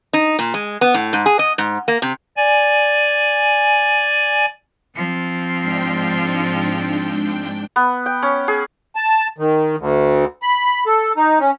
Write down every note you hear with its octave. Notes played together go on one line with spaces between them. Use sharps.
D#4
A#2
G#3
B3
A2
G#2
G#4
D#5
G#2
A#3
C3
D5 G#5
F3 C4
G#2 D4 G5
B3
G5
C#4
G#4
A5
D#3
D2
B5
A4
D#4
C#4